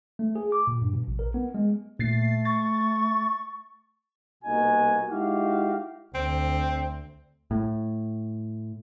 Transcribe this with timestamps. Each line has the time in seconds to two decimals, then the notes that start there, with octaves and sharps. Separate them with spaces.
0.19 A3
0.36 G#4
0.52 D6
0.67 A#2
0.82 G2
0.93 B2
1.07 A#1
1.19 A#4
1.34 B3
1.54 G#3
1.99 A#2 A3 A6 C7
2.45 C#6 A6
4.44 C2 B2 A#3 D#4 F#4 G#5
5.08 G#3 D#4 E4 F#4 G4 F5
6.15 D2 C4
7.51 A2